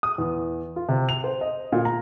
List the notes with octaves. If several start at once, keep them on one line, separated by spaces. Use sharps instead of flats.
D#6
E2
F4
C3
F7
C5
D#5
A#2
A#5